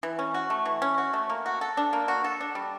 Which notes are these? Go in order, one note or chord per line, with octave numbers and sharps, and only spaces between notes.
E3
C#4
F#4
A3
E3
C#4
F#4
A3
A#3
F#4
A4
D4
A#3
F#4
A4
D4
G3